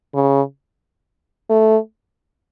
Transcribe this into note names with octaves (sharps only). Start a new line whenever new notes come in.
C#3
A3